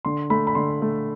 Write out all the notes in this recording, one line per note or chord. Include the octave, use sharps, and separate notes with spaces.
D3 C6
A3 B5
B5
D3 C6
A3